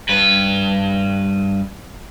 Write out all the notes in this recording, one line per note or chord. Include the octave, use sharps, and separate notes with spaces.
G2 B4